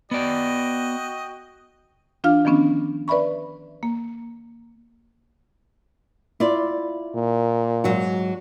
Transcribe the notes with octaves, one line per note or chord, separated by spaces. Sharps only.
B3 F#4 D5 D#5 G5
E3 D4 F4 F5 F6
D#3 F3 B3 C#4 D4
B4 D5 E5 B5 C#6
A#3
E4 F4 D5
A#2
G#2 F#3 F#4